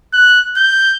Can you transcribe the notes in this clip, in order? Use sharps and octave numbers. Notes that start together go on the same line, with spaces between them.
F#6
G6